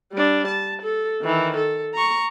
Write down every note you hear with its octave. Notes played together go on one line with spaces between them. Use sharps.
G3 D4
A5
A4
D#3 E3
A4
A#5 C#6